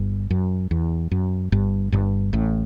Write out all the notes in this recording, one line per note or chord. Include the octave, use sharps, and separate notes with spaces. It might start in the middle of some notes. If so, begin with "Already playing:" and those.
Already playing: G1 G2
F#2
E2
F#2
G1 G2
G1 G2
A1 A2